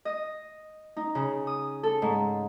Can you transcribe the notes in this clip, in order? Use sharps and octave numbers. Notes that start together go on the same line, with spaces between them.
D#5
D#4
C#3
D#6
A4
G#2